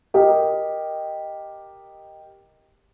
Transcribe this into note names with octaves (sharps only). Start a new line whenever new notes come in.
G4 A#4 D#5